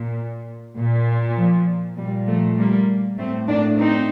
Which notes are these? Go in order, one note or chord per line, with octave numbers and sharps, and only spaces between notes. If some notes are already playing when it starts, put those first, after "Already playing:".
Already playing: A#2
A#2
F3
A#2 G3
F3 A3
G3 A#3
A2 A3 C4
A#3 D4
C4 D#4